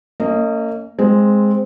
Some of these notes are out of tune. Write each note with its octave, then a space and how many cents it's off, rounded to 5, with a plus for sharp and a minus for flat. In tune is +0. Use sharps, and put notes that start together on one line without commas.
A#3 -35 C#4 +20 D#5 +0
G#3 +0 C4 +0